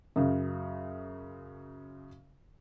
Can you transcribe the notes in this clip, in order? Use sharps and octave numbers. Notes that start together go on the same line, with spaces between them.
F#2 C#3